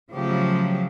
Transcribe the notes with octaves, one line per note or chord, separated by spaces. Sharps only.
C#3 F3 F#3 A3 G4